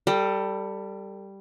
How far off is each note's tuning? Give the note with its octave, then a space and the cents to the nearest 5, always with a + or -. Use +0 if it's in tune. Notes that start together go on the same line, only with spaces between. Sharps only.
G3 +0 A4 +25